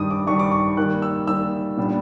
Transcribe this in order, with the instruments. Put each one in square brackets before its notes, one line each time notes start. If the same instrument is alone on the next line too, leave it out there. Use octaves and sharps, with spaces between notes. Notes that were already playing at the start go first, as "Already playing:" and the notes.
Already playing: [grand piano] G2 D#3 G3 D#6
D6
G2 D#3 G3 C#6
D6
C#6
D#3 G3 A#3 F#6
E6
D#3 G3 A#3 E6
A#2 G3 B3 D4